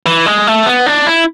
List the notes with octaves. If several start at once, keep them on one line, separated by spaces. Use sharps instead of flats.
E3
G#3
A3
B3
D4
E4